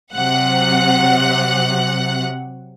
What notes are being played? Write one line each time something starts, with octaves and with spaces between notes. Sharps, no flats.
C3 F#3 F#5 F#6